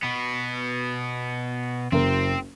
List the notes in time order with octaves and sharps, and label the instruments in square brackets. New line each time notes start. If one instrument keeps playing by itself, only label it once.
[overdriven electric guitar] B2 B3
[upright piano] F#1 A#4 [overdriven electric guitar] C4